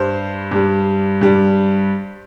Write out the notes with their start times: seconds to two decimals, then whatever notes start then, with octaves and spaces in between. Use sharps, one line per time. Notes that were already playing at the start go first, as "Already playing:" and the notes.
Already playing: G2 G3 C5
0.52 G2 G3
1.21 G2 G3